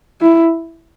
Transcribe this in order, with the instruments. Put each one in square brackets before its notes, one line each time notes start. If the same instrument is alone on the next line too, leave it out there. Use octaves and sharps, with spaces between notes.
[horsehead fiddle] E4